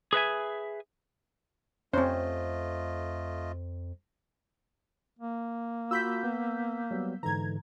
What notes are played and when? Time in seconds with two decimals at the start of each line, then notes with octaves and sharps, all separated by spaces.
0.13 G#4 B4 E5 G#5
1.93 F2 A3 C4 C#4 F4 C5 D#5
5.19 A#3
5.91 F4 F#4 B5 E6 G6 B6
6.24 B3
6.91 F#3 G3 B3
7.23 G#2 D3 E3 A#5 G#6